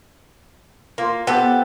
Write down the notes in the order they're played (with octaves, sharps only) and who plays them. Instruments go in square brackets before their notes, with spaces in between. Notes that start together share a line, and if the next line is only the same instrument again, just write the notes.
[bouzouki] A#3 [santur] F4 C6
[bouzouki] B3 A4 [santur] C4 G4 B4